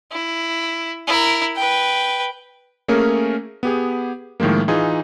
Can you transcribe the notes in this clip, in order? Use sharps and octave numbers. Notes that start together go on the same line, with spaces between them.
E4
E4 A#4
B4 G5
A3 A#3 C#4 G#4 A#4 C#5
B3 G4 G#4
A2 D#3 F3 G#3 A#3
E3 D#4 F4 G#4